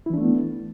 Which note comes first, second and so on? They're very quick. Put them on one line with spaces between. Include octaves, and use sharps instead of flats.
E4 E3 D4 A3 B3